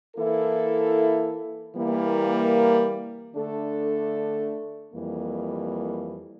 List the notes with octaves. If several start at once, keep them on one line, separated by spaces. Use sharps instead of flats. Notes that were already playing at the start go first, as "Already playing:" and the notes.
E3 A#3 E4 A4
E3 G3 A#3
D3 A3 D4 A4
F2 E3 G3 A#3